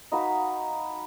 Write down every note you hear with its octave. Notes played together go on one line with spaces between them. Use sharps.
D#4 F#4 B4 F5